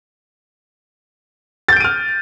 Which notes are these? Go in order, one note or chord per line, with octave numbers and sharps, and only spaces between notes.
F6 G6 A6 D7 D#7